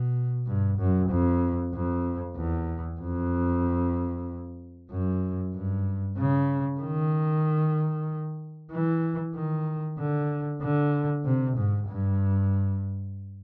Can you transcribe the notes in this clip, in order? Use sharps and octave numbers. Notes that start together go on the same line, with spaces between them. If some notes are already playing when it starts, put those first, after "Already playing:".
Already playing: B2
G2
F#2
F2
F2
E2
F2
F#2
G2
C#3
D#3
E3
D#3
D3
D3
C3
G#2
G2